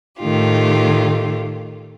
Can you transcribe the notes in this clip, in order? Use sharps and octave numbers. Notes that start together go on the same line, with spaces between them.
A2 D#3 A3 F4 G4